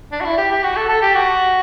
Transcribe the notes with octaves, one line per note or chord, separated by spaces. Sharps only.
D4
F#4
E4
G4
G4
F#4
A4
A4
G4
F#4